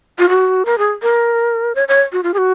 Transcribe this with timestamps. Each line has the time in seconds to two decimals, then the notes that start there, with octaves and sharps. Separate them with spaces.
0.19 F4
0.29 F#4
0.66 A#4
0.78 G#4
1.03 A#4
1.75 C#5
1.88 C#5
2.13 F#4
2.23 F4
2.34 G#4
2.38 F#4